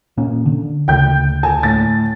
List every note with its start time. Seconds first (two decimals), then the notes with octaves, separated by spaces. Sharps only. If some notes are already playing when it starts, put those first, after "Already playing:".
0.17 A#2 A#3 C#4
0.46 D3
0.88 D2 C#3 G5 G6
1.43 G#5 A5
1.63 A2 A6